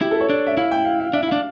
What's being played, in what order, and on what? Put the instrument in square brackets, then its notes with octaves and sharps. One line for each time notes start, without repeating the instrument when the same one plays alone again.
[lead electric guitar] E4 [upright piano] G4
[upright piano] A4
C#5
[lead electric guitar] D4
[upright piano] E5
[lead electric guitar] E4 [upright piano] F5
[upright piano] G5
F5
F5
[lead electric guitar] D4 [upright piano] E5
[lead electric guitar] E4
[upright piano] F5
[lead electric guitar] D4